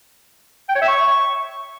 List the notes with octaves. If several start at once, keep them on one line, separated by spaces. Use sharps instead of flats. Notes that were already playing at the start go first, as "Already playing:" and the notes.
G5
C#5
E5
C#6